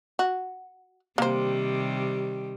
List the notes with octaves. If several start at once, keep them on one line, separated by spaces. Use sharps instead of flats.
F#4
C3 D#3 G3 A#3 C5